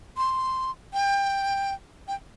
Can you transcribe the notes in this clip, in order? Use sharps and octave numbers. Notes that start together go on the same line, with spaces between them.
C6
G5
G5